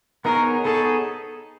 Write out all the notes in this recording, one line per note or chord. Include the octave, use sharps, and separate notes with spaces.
B3 D#4 G#4 A#4 C#5
B3 D#4 G#4 A4 C#5